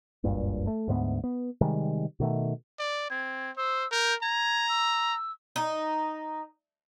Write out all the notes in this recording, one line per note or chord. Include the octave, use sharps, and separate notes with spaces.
F#1 C#2 G2 A#2
A3
D2 G#2 G3 B3
B3
C3 D#3 G3 G#3
B2 D#3 A3
D5
C4 G#6
C5 E6
A#4 G6
A#5 G#6
E6
D#4